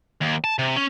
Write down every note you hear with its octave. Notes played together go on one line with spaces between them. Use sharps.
D#2
A5
C3
C#4